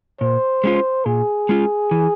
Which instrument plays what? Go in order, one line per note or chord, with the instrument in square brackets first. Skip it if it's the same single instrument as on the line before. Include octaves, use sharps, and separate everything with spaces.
[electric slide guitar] A#2 [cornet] C5
[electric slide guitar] G#3 C#4 F4
[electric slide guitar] A#2 [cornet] G#4
[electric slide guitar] G#3 C#4 F4
E3